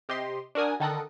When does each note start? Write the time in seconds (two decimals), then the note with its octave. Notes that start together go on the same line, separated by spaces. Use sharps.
0.09 C3 G4 D#5 C6
0.55 D4 F#4 A#4 G#5 D#6
0.80 D3 D#3 A4 A#4 D#6 F#6